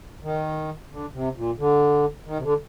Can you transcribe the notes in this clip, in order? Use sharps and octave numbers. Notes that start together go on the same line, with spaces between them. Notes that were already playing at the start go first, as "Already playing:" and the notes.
D#3
D3
C3
A#2
D3
D#3
C3
D3